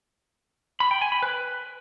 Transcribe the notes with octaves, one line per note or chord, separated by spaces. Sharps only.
B5
G5
G#5
B5
B4